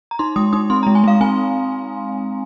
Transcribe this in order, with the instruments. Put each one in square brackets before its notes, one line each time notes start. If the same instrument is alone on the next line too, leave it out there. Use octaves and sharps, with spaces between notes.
[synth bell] A#5
D#4 C6
G#3 D#6
D#4 D#6
C4 C6
G#3 A#5
G#5
G#3 F5
C4 G#5